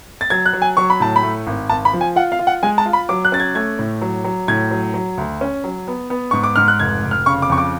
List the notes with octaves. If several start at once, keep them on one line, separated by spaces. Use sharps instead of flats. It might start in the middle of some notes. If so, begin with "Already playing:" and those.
A6
F#3 G#6
F#6
F#3
G#5
F#3 C#6
B5
A2 A5
B5
A3
G#1
G#1 A5
B5
F3
G#5
F4 F#5
F5
F4
F#5
G#3 G#5
A5
F4
B5
F#3 D6
F#6
C#4 A6
G#6
A3 G#6
A2
F#3
F#3
A2 G#6
F#3
F#3
D2
C#4
F#3
B3
B3
G#2 C#6
D6
G#2 F6
F#6
F1 G#6
F1
F6
C#3 C#6
D6
F2 C#6
D6